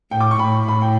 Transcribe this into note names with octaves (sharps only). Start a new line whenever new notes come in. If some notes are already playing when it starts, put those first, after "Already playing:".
A2 G5
D6
C#6
A2 B5
A2 B5
G5